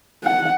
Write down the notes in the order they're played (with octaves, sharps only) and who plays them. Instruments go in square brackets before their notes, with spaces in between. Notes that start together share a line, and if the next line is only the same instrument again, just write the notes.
[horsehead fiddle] F#5